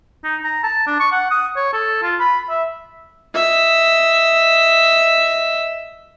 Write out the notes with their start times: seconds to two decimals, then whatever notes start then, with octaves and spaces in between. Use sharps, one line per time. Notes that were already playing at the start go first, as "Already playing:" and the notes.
0.24 D#4
0.44 A#5
0.64 A5
0.87 D4
1.00 C#6
1.12 F#5
1.31 D#6
1.56 C#5
1.73 A4
2.03 F4
2.20 B5
2.50 E5
3.35 D#5 E5